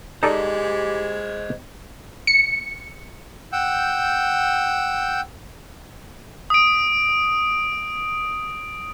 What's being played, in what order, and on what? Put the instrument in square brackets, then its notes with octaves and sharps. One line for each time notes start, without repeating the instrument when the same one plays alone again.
[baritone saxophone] G#3 [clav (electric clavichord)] D#4 A4 D5 [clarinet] G4 [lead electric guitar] C5 D#5
[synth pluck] C#7
[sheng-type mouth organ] F#5 G5 E6 G6
[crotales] D#6 D7